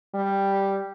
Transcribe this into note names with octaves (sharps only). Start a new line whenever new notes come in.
G3